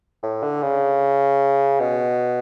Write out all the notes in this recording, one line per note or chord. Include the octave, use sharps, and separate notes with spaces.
A2
D3
C#3
B2